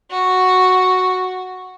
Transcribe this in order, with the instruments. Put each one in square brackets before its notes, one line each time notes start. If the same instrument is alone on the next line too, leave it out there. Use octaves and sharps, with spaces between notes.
[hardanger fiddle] F#4